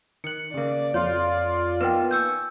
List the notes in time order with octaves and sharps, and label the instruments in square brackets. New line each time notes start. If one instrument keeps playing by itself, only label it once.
[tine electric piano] D#3 F#6 [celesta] C#7
[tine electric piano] C#3 A#3 [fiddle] D5
[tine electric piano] F2 [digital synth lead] F4 [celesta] C#5
[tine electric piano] A#3 B3 D#4 [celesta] B4 G5
[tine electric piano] G#5 C#6 [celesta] E6 G6